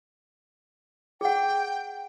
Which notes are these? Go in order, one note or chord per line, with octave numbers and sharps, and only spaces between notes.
G#4 F#5 G5